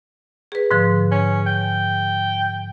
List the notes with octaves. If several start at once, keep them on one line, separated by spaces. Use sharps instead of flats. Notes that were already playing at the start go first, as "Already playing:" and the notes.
G#4 B4
G#2 D3 F3
C#4
G5